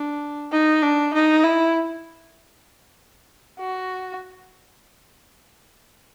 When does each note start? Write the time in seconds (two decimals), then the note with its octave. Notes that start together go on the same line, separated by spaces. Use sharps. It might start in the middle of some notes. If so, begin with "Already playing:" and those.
Already playing: D4
0.52 D#4
0.82 D4
1.14 D#4
1.44 E4
3.59 F#4